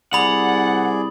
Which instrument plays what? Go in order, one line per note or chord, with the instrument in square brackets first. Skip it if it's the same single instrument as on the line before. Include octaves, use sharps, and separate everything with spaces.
[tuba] C2 [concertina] G#4 D5 [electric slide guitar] F#5 [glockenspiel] B5 F#7